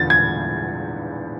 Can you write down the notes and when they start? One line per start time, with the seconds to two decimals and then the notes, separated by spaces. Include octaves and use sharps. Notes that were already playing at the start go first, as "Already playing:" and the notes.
Already playing: E2 D3 F3 A6
0.10 G#6